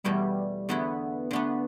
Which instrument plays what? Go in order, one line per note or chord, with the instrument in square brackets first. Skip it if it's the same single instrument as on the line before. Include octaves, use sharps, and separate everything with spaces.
[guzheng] E2 B2 A3 E4 [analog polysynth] G3
[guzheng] E2 D3 A3 E4 [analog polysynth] B3
[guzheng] D3 A3 D4 [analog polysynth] B3